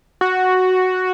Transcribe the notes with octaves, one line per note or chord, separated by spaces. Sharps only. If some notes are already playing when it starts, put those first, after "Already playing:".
F#4